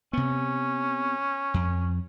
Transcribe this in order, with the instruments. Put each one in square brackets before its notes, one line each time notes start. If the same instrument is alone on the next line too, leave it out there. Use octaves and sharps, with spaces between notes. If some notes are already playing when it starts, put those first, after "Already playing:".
[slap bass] C3 B3 [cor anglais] C#4
[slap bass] F2